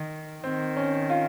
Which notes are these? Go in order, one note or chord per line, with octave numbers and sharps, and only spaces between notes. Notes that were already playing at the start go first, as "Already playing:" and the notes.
Already playing: D#3
D#3 C4
C#4
F4